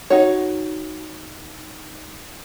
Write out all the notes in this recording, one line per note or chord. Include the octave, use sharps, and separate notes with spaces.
D#4 F#4 C#5